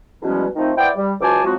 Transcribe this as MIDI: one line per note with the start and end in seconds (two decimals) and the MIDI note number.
0.22 0.46 40
0.22 0.46 47
0.22 0.46 53
0.22 0.46 55
0.22 0.46 56
0.22 0.46 61
0.56 0.71 51
0.56 0.71 53
0.56 0.71 57
0.56 0.71 60
0.56 0.71 63
0.77 0.89 59
0.77 0.89 64
0.77 0.89 72
0.77 0.89 74
0.77 0.89 79
0.96 1.12 55
1.21 1.41 37
1.21 1.41 54
1.21 1.41 72
1.21 1.41 80
1.21 1.41 81
1.21 1.41 86
1.44 1.54 53
1.44 1.54 54
1.44 1.54 56
1.44 1.54 60
1.44 1.54 66